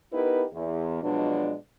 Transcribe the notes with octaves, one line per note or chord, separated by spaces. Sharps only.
B3 D#4 E4 G4 A#4 B4
E2
B2 F3 F#3 G#3 D4